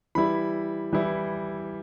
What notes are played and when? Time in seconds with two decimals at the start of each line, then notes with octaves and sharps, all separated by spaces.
0.15 E3 G3 E4 B5
0.93 E3 G3 E4